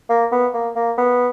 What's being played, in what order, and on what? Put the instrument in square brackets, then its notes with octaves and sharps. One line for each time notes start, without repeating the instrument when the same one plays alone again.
[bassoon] A#3
B3
A#3
A#3
B3